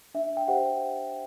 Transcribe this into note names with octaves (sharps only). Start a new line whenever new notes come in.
D4 E5
G5
G4 C5 F#5